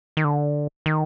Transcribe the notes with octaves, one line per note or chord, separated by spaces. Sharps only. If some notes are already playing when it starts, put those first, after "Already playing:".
D#3
D3
D#3